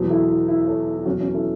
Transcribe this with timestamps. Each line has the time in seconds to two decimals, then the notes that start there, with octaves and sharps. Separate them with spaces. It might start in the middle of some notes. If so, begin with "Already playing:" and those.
Already playing: E2 B2 F#3
0.10 E4 A4
0.28 E4
0.48 E4
0.61 E5
0.67 A4 C#5
0.86 E4
0.97 E4
1.05 E2 B2 F#3 C#4 F#4
1.20 C#4 F#4
1.34 E4 A4